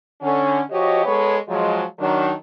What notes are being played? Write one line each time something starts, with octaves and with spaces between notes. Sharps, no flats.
D3 C#4
F3 F#4 G4 C#5 D#5
G#3 B3 A4 C#5
F3 F#3 G#3
D#3 F#3 D4